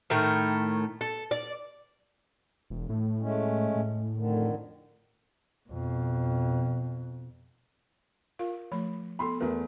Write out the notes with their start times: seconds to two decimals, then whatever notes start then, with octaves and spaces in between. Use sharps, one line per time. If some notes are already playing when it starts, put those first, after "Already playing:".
0.10 A2 D#3 A3 A#4
1.01 A4
1.31 D5
2.70 E1
2.89 A2
3.21 G#3 A3 C#4
3.76 A2
4.17 F2 D3 D#3
5.69 F2 B2
8.39 F4 A#4 F5
8.72 F3 A3 B5
9.19 B3 A4 B5 C6
9.40 E2 A3 A#4 B4